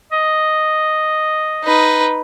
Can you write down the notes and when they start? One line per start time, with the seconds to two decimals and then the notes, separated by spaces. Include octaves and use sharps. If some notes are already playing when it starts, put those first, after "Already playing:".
0.12 D#5
1.64 D#4 B4